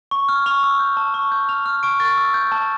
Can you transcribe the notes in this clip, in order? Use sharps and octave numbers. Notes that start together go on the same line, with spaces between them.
C#6
F6
C#6 F7
E6
G6
A5
C#6
G6
F6 F7
F6
C#6 D7
C#6 A6
E6
G6
A5